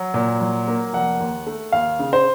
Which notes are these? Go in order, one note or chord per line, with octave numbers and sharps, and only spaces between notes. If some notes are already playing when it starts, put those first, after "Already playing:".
Already playing: F#3
A#2
F#3
A#3
F1 F#5
D#2
A3
D#2 F5
C#3
C5